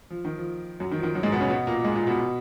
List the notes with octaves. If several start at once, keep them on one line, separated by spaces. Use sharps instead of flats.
F3
D#3
F3
F#2 F#3
D#3
F3
D#3
F#2 F#3
G#2 G#3
B2 B3
C#3 C#4
B2 B3
A#2 A#3
G#2 G#3
A#2 A#3
B2 B3